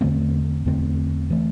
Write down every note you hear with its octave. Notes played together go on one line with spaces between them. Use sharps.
E2 D3 A3 C4
E2 D3 A3 C4
E3 A3